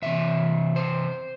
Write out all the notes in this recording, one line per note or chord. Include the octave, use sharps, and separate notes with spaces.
C3 E3 C4 E5
C5